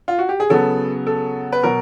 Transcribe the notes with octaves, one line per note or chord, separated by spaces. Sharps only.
F4
F#4
G4
G#4
C#3 F#3 B3 A4
A4
B4
B2 F#3 A#4